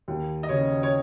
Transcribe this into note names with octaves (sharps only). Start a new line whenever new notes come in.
D#2
D#5
C#3 C#5
C#5